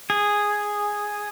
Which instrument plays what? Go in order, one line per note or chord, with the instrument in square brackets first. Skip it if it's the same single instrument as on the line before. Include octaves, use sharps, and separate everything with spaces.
[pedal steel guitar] G#4